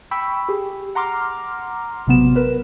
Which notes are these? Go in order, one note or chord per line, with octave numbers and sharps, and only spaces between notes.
G5 B5 C#6 E6
G4 G#4
F#5 A#5 C6 D6 F6
A1 C3 F#3 B3 E7
A#4 B4